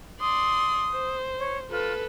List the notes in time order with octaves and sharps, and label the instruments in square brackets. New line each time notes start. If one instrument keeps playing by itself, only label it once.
[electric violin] D5 C6 [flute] D#6
[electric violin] C5
[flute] C#5
[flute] F4 [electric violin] A4 B4